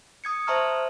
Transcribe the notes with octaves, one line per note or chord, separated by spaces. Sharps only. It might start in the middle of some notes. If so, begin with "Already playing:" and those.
D#6 G#6 C#7
C5 E5 A5 A#5 C#6 F6